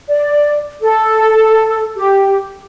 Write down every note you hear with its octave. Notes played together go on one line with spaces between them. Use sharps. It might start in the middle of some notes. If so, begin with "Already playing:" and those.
D5
A4
G4